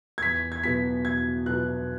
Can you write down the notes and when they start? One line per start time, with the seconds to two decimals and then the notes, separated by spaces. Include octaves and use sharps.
0.18 G#6
0.23 E2 B6
0.52 G#6
0.64 B2 F#3 B3 B6
1.05 E2 G#6
1.46 B2 F#3 B3 F#6